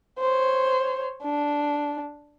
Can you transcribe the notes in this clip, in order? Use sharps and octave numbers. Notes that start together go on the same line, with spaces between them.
C5 C#5
D4